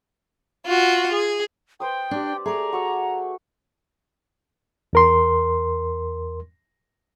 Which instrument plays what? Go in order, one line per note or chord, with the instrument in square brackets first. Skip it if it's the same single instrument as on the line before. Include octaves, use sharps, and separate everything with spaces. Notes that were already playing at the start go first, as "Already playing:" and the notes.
[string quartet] F4 F#4
G#4
[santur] B4 C5 D#6 [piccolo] G5
[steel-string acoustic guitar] D4 [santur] G4 D5
[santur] A3 [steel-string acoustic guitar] G#4 D5 [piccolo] A#5
[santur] F#4 C#6 E6
[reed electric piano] E2 A#4 C6